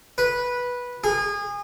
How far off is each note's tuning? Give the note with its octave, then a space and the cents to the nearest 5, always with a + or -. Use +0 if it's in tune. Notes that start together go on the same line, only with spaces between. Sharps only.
B4 -10
G#4 -30